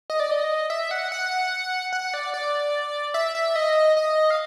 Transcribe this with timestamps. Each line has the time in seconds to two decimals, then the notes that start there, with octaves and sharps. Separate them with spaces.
0.10 D#5
0.20 D5
0.31 D#5
0.70 E5
0.91 F#5
1.12 F#5
1.93 F#5
2.14 D5
2.34 D5
3.14 E5
3.35 E5
3.56 D#5
3.97 D#5
4.30 F5